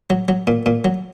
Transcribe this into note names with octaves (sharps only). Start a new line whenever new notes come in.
F#3
F#3
A#2
A#2
F#3